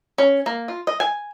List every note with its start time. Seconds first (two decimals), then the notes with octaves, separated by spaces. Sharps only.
0.18 C#4
0.46 A#3
0.68 F4
0.87 D#5
1.00 G#5